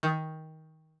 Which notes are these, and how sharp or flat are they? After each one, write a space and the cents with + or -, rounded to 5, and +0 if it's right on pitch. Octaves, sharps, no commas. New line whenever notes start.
D#3 +20